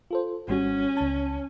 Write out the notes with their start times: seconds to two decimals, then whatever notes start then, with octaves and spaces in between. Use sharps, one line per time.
0.11 F4 A4 C5
0.48 G#1 G3 C#4 F#4
0.97 C#2 A5